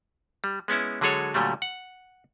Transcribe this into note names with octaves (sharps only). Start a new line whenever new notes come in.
G3
G#3 B3 C#4 E4
D3 F#3 G#3 G#4 A4 C#5
A#2 D3 F#3 G3 A3
F#5